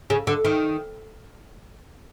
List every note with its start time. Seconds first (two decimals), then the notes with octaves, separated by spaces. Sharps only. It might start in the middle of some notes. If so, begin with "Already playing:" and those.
0.10 C#3
0.27 D3
0.45 D#3